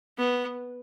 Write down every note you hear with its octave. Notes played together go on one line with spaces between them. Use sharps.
B3